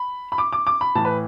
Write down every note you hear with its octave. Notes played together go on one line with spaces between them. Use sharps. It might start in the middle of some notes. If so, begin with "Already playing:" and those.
Already playing: B5
B5
D6
D6
D6
B5
A2 E3 A5
B4